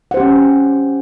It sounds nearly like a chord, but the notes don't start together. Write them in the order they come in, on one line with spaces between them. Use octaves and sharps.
F#5 C5 G4 C#4